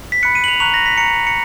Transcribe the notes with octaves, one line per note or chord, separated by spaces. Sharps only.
B6
B5 F#6 C#7
D#7
F#7
F7
A#5 C#6 F#6 F7
A#6
B6
A#5 C#6 F#6 C#7
C#7